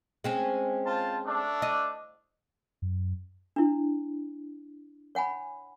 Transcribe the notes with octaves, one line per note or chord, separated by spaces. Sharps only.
G#3 C4 C#4
F4 C5 A5
A3 D4
D#5
F#2
D4 E4
C#5 F#5 G#5 B5